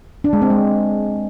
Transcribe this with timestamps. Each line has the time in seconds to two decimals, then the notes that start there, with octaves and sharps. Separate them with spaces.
0.24 D4
0.33 G#3
0.42 C4
0.50 G#3